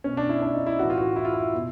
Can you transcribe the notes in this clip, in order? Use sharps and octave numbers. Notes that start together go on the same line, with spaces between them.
B2 C#4
D4
E4
D4
D#4
E4
A2 E3 F#4
F4
F#4
E4
F4
E4
B2